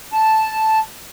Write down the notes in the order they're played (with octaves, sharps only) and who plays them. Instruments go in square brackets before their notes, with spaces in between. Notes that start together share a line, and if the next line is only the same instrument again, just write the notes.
[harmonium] A5